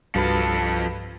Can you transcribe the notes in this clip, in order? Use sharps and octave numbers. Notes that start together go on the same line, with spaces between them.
C2 G2 F3 F#4 A4 B4 B5